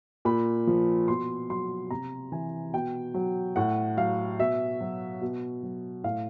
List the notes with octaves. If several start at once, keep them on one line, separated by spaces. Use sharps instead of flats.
A#2 B5
F3
B2 C6
F#3 C6
C3 A#5
E3 G#5
B2 G5
F#3
A2 F#5
F#3 F5
B2 E5
F#3
B2
F#3
A2 F5